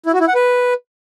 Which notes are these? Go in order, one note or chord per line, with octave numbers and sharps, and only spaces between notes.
E4
F#4
E4
F#5
B4